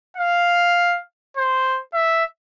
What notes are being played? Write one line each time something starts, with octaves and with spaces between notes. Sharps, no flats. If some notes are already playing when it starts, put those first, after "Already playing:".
F5
C5
E5